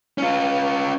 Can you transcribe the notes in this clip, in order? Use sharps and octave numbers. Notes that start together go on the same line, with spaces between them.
C#4 F4